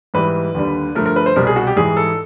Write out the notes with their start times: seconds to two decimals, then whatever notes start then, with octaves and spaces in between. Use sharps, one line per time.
0.14 G#2 E3 G3 B4
0.55 D#2 D3 G3
0.95 G2 D3 F3 A3 A#4
1.06 A#4
1.16 B4
1.26 C5
1.36 C2 B2 G3 A#4
1.47 G#4
1.56 F#4
1.67 G4
1.76 G#2 E3 G3 G#4
1.97 A4